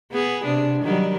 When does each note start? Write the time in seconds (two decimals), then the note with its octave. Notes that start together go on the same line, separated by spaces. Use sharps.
0.11 B3 G#4
0.44 C3 D4
0.82 D#3 F#3 G3